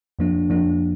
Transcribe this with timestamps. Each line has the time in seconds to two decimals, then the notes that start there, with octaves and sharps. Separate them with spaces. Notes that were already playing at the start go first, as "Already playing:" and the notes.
0.19 F2 F3 A#3 D4
0.49 F2 F3 A#3 D4